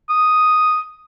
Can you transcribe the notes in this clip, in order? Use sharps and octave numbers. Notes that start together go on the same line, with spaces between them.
D#6